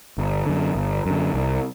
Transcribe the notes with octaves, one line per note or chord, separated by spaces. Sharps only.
G1
F#2 D3
G1
F#2 D3
C2